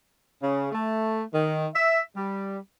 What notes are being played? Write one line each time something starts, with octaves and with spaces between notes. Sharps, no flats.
C#3
A3
D#3
E5
G3